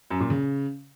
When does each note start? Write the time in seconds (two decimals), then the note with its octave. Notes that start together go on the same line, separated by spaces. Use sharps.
0.11 F#2
0.20 A#2
0.30 C#3